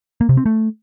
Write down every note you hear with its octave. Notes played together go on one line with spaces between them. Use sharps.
A#3
C3
C4
A3